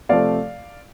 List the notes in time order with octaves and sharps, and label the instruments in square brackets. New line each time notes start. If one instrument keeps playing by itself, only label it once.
[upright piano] C3 F3 A3 D5 F5